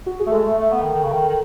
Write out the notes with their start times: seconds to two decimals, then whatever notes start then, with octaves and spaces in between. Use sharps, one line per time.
0.06 F#4
0.20 G#4
0.26 A3
0.31 G#3 A4
0.45 A3
0.58 A3
0.72 B3
0.82 D#3
0.93 D#3
1.03 C#3
1.12 D#3
1.28 D#3